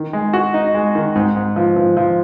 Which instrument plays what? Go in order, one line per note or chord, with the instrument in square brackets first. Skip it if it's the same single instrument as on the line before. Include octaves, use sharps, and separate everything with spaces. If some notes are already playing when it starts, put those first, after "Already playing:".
Already playing: [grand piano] D#3
G#3
F#4
D#4
G#3
D#3
G#2
G#2
F3
F3
F3